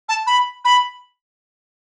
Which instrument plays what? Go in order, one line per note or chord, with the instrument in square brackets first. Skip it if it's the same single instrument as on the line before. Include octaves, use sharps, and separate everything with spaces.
[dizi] A5
B5
B5